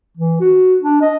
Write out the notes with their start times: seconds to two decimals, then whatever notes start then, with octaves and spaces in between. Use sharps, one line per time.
0.17 E3
0.40 F#4
0.81 D4
1.02 D#5